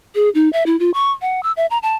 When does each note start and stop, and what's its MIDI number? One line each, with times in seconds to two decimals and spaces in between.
0.15 0.29 68
0.35 0.51 63
0.53 0.63 76
0.66 0.78 64
0.80 0.91 65
0.94 1.11 85
1.22 1.43 78
1.43 1.52 88
1.57 1.66 76
1.71 1.78 82
1.83 1.96 81